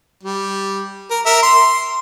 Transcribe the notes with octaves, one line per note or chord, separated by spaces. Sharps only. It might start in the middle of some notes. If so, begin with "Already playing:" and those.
G3
A#4
A#4 E5
C6